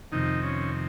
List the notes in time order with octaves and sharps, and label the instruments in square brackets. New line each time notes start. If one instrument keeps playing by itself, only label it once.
[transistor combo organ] F2 C3 D#3 D#4
C#4